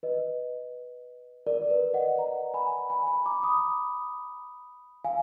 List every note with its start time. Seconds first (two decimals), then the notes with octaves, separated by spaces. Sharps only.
0.03 B4 D#5
1.47 A#4 D5
1.62 A#4
1.70 B4
1.94 D#5 F#5
2.18 F#5 A#5
2.54 G#5 B5
2.89 G#5 B5
3.07 G#5 B5
3.26 A#5 D6
3.43 B5 D#6
5.05 F5 G#5